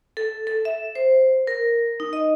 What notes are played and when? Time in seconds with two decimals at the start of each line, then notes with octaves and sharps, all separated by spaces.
0.17 A4
0.47 A4
0.65 E5
0.95 C5
1.47 A#4
2.00 D#4
2.13 D#5